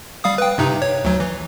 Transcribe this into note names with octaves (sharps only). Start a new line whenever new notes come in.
G3 F5 D#6
B4 G5
G2 C3 D#4
C#5
D2 F#3
E3